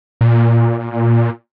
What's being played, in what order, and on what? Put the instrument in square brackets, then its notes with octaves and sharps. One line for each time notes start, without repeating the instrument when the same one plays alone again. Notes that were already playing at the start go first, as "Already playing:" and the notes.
[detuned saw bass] A#2